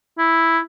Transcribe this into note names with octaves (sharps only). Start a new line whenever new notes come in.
E4